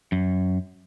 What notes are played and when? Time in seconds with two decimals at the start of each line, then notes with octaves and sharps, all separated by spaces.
0.12 F#2